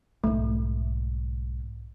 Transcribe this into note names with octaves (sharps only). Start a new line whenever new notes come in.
B1 G#2 A3